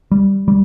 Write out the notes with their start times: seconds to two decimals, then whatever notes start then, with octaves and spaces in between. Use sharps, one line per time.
0.11 G3
0.48 G3